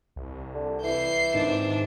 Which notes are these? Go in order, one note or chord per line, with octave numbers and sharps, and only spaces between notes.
C2
D3
E3 G6 C7
G#2 D#3 C4 D4